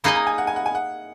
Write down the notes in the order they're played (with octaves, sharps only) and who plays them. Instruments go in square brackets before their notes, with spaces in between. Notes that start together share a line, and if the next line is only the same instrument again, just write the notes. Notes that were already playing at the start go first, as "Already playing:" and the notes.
[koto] A#3 D#4 G#4 D#5 [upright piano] B5
[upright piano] A#5
G#5
F#5
G#5
F#5
G#5
F#5